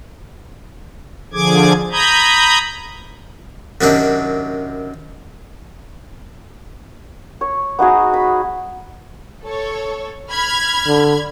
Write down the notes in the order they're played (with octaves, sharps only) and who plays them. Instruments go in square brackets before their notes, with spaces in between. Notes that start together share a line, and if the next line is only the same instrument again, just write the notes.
[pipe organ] D3 F3 G#4 D6 G#6
A#5 B5 D#6 G6 G#6
[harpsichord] F#2 C3 D#3 F#3 D4
[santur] C#5
B3 D#4 F#4 G#4
B5
[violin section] A4 C#5
B5 F6 G#6
[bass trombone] D3